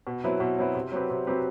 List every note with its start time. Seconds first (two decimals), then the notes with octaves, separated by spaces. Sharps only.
0.07 B2
0.24 F#3 C4 E4 B4
0.40 B2
0.58 F#3 C4 E4 B4
0.75 C3
0.92 F#3 C4 G4 B4
1.10 C3
1.27 F#3 C4 G4 B4